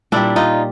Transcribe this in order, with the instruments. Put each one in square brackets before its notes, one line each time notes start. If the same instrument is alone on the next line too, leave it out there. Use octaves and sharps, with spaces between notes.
[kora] A#2 G3 D4 E4
D#4 F4